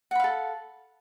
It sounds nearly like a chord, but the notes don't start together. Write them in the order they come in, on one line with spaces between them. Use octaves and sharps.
F#5 B5 F5 A4